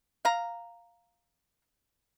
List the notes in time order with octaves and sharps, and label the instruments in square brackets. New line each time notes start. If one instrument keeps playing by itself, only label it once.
[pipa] F5 A#5